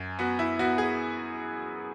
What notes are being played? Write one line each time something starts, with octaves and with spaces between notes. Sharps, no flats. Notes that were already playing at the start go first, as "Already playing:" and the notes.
Already playing: F#2
B3 F#4
E4
B3 F#4
G#4